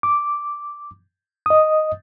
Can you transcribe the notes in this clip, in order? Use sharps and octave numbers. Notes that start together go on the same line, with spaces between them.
D6
D#5 D#6